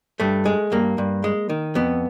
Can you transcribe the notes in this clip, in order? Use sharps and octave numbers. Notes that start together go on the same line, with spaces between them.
G2 A3
G#3
G2 A#3
G2
G#3
D#3
F2 B3